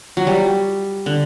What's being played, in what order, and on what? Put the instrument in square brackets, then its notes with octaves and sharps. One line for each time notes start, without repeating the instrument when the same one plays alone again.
[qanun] F#3
G3
D3